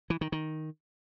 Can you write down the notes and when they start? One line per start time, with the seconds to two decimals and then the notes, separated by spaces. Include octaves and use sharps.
0.10 E3
0.21 D#3
0.32 D#3